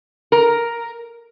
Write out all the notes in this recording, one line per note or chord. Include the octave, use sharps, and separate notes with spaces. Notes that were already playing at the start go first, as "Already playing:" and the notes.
A#4